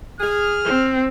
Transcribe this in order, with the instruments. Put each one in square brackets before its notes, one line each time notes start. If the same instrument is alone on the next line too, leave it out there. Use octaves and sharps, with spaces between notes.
[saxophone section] G#4 [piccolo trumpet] F6
[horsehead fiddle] C4